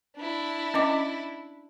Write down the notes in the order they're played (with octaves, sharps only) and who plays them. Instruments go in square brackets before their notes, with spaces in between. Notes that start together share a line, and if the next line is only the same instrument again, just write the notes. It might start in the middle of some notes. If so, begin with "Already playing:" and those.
[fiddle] D4 E4
[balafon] C#4 D#5 D6